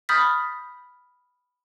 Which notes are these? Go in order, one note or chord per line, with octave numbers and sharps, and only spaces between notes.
B5 D#6 F6 G6 A6 B6